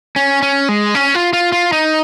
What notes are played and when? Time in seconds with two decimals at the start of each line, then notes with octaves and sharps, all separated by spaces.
0.16 C#4
0.42 C#4
0.69 G#3
0.95 C#4
1.15 F4
1.33 F4
1.52 F4
1.73 D#4